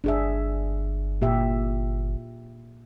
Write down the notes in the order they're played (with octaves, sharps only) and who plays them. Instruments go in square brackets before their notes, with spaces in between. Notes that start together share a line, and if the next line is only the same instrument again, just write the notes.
[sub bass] G1 [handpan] D4 G#4 E5
[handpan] A#2 G4 E5